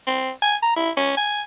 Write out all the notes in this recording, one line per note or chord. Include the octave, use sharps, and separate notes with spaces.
C4
G#5
A#5
E4
C#4
G#5